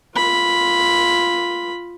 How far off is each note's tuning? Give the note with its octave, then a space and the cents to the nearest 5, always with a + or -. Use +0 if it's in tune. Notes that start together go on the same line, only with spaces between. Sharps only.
F4 +0 B5 +0